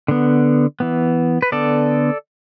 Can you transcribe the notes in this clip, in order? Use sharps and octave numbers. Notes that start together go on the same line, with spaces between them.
D3 B3
E3 B3
B4
D3 B3 A4 D5